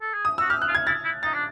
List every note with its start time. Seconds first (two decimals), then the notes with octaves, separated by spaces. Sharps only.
0.01 A4
0.14 G#4
0.25 D#6
0.38 F#4 E6
0.50 G4 F6
0.62 F#6
0.68 F4
0.75 G#6
0.87 E4 A6
1.05 E4
1.23 D#4 A6
1.34 D4